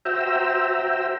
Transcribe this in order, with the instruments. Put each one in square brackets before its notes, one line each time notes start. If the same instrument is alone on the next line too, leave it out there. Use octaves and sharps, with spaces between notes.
[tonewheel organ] F#4 C5 E5 G5 A#5 E6